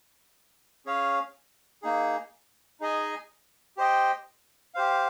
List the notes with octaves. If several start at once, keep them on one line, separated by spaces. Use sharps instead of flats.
C#4 G#4 C#5 F5
A#3 D#4 G#4
D#4 G#4 D#5 G#5
G4 C5 D#5 G5
G4 C5 F5